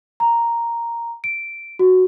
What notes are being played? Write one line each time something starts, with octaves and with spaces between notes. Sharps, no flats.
A#5
D7
F#4